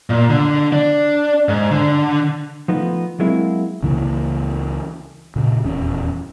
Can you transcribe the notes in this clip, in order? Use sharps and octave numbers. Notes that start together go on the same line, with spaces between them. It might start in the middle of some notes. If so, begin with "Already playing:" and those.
A#2
D3
D4
G#2
D3
F3 A3 B3 D#4
F#3 G#3 A#3 C4 E4
C#2 C#3 E3 A#3
A#2 C#3
D#1 E2 C#4